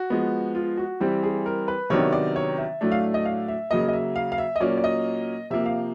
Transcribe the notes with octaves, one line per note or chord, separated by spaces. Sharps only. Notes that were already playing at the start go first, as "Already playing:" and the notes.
Already playing: F#4
F3 G#3 B3
F4
F#4
E3 G3 C4 G4
G#4
A#4
B4
C3 D#3 F#3 B3 D4 C#5
D5
C#5
E5
A2 F#3 A3 D4
F5
D#5
F5
E5
C#3 F#3 A#3 D#5
D#5
E5
F5
F5
E5
D#5
A#2 F#3 A#3 C#4 D5
D5
D#5
C3 F3 A#3 E5
F5